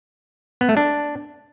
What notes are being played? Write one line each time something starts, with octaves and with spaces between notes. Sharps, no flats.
B3
A3
D4